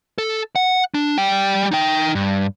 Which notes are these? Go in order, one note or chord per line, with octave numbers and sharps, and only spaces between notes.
A4
F#5
D4
G3 G5
D#4 G5
G2